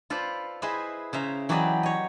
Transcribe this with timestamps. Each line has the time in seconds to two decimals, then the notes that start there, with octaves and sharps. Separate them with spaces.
0.10 F4 A4 B4 C5 D5
0.62 E4 G#4 B4 C5 D#5 E5
1.13 C#3 C5 E5 A#5
1.49 E3 F#3 G4 B4 D5 D#5
1.83 C#5 D#5